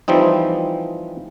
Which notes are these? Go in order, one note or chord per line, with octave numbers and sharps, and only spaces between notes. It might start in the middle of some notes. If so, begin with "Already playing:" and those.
E3 F3 G3 C4 D#4